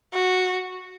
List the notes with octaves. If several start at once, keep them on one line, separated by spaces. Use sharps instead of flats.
F#4